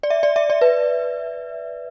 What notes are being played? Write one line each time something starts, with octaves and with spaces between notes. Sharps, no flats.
D5
E5
D5
E5
D5
B4